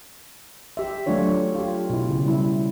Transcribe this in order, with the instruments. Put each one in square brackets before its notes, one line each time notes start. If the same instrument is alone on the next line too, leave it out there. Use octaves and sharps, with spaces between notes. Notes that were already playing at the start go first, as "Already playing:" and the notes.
[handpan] G4 E5
F#3 A3 D4 F4 C#5
F4 G4
B2 E4
C#3
G3 E4